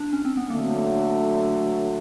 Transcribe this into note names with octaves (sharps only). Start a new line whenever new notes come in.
D4
C#4
C4
B3
D3 F#3 A3 A#3